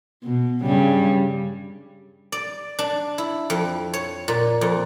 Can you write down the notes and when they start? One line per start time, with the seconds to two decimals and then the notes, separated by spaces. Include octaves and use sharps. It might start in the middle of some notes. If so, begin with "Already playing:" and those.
0.24 B2
0.63 G2 C#3 G3
2.32 D5
2.79 D4
3.18 E4
3.50 F2
3.94 C#5
4.28 A#2
4.61 F2